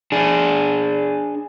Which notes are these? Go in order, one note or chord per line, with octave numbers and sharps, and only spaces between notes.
D4 G#4